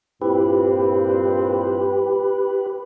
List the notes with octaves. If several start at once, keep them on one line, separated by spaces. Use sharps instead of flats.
G2 A#2 C4 E4 F4 G4 B4